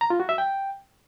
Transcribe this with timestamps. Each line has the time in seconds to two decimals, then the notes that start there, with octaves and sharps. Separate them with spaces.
0.01 A#5
0.10 F4
0.20 F#4
0.29 E5
0.38 G5